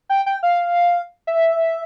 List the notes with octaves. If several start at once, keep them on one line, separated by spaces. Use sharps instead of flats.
G5
G5
F5
E5